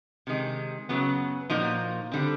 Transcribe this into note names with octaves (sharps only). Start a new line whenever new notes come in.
C3 D#3 G#3
F#2 C#3 F#3 B3
A#2 F3 A#3 D#4 F#4
D3 G3 C4